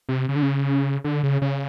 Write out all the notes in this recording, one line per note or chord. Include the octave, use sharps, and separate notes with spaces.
C3
C#3
D3
C#3
D3
C#3
C#3